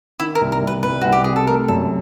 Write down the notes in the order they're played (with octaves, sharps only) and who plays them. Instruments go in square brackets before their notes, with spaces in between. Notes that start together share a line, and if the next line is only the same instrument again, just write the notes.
[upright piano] D#3 [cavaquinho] E4
[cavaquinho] A#4
[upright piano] C2
[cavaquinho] A#4
[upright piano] C2
[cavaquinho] B4
[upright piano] C2 [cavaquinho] B4
[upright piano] C2 [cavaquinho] F#4
[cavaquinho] G4
[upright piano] C3 [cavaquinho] G#4
[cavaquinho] A4
[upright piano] A3 [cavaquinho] A#4
[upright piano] F#2 [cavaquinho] A4